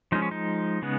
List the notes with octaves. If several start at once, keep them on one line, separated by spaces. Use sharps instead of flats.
F3 G#3 C#4 D#4
C#4
D#4
C#3 G#3 B3